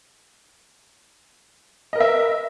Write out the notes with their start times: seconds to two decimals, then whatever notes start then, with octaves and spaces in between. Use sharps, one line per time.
1.93 D#5
1.95 A#4
1.98 B4
2.00 E5